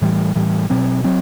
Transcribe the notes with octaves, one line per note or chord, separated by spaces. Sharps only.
A2 E3 G3
A2 E3 G3
B2 F#3 C4
F#3 C4